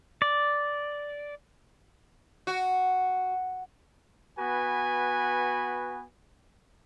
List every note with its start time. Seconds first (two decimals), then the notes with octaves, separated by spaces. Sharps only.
0.22 D5
2.47 F#4
4.39 B3 F#4 B4 G#5